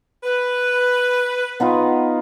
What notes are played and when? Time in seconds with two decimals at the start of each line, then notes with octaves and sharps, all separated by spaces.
0.24 B4
1.60 B3 D#4 F4